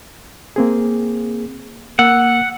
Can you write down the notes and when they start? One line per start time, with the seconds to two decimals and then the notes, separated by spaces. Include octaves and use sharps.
0.56 A#3 C4 G#4
1.99 A#3 F#5 E6 F#6